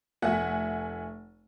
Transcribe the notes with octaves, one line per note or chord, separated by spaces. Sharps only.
F1 A3 E5 F#5 G#5